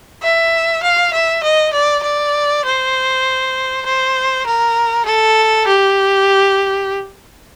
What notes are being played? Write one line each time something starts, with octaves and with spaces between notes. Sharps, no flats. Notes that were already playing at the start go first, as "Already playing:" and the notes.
E5
F5
E5
D#5
D5
D5
C5
C5
A#4
A4
G4